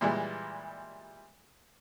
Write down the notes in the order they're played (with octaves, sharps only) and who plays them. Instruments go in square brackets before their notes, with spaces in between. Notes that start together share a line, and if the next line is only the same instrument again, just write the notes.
[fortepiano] A#2 E3 G3 G#3